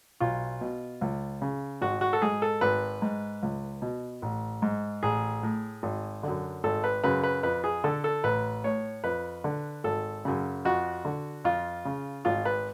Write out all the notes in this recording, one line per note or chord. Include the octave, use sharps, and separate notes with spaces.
B1 F4
B2
C#2
C#3
G#1 F#4
F#4
A4
G#2 G#4
A4
G#1 B4
G#2
C#2
B2
A1
G#2
A1 G#4
A2
G#1
F#2 D3
G#1 A4
B4
F#2 C#3 B4
B4
F2 B4
G#4
D3 A4
A4
A1 B4
A2 C#5
F2 B4
D3
G#1 A4
F#2 C#3
F2 F#4
D3
F2 F4
C#3
G#1 F4
B4